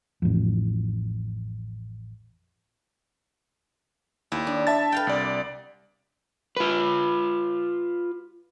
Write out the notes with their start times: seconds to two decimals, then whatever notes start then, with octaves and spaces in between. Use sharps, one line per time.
0.22 A1 F2
4.32 D#2 E4
4.47 D4
4.67 E5 A5 A6
4.92 B4 F5 G5
5.07 C2 D5
6.57 F4 B4